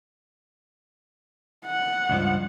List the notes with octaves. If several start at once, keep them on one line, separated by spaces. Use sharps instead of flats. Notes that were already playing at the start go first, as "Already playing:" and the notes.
F#5
C#2 G2 F3